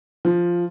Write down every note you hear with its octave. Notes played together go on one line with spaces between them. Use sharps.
F3